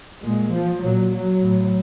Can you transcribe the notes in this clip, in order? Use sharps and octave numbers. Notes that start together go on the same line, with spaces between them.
A#2 G#3
F3
A#2 F#3
F#3
A2